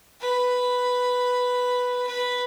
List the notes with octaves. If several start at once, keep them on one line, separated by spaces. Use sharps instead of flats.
B4
B4